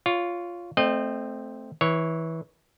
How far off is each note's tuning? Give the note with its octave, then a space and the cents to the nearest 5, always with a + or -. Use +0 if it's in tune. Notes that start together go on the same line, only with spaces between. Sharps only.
F4 +0 C#5 +20
A3 +0 C4 +0 D#5 -30
E3 -20 C#5 +0